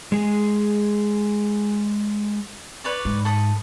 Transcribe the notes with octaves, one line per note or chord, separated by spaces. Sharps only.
G#3 G#4
B4 C#5 D5
G#2
A4 B5 D#6